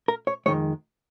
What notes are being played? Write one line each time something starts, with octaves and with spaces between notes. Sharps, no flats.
A#4
C#5
F2 D#3 G#3 C#5